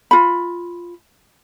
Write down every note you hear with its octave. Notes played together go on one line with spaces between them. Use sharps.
F4 B5